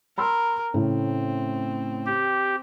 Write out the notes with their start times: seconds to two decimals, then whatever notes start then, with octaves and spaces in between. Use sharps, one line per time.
0.18 A#4 B5 C6 E6
0.74 A2 C#3 A3 C4
2.06 G4